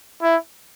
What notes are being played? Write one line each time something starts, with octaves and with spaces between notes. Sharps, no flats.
E4